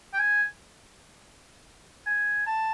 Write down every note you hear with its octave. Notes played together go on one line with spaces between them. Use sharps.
G5
G#5
G#5
A5